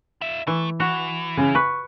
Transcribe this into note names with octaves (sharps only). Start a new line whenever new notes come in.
F4 E5
E3 A3
E3 F#4
C#3
B4 C#6